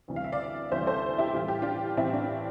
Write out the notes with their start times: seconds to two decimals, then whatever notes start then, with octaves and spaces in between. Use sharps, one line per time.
0.08 D2 C3 E3 G3
0.16 F5
0.24 E5
0.32 D5 F5
0.71 D2 C3 E3 G3 C5 E5
0.87 A4 C5
1.18 E4 G4
1.34 A2 E3 G3 F4
1.48 G4
1.62 D4 F4
1.97 A2 E3 G3 C4 E4
2.14 D4